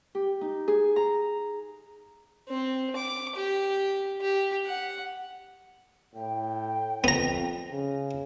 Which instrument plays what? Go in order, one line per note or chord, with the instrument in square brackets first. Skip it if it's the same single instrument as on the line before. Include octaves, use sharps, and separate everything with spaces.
[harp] G4
D#4
G#4
A#5
[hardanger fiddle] C4
D6
G4
G4
F#5
[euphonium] A2 [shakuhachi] G5
[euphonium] F2 [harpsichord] B3 A#5
[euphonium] C#3